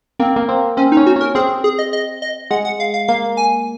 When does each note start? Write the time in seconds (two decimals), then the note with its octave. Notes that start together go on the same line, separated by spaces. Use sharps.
0.19 A#3 C4
0.36 A#3
0.49 C4
0.77 C4 C#4
0.92 D#4
0.97 C#4
1.06 F#4
1.16 C#4 A#4
1.35 C4 G#4
1.64 G#4
1.79 D#5
1.93 D#5
2.22 D#5
2.51 G#3 F#5
2.65 F#5
2.80 F5
2.94 F5
3.08 A#3 F5
3.37 G#5